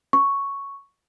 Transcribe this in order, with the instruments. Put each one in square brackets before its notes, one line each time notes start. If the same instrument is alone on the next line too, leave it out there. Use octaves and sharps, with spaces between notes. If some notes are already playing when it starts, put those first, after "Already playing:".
[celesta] C#6